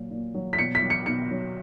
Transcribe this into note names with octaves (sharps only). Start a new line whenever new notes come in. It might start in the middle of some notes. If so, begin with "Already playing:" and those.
Already playing: A#2 F#3
A#2
F#3
B6
B2 C#7
B6
F#3
C#7
B2 C#7
F#3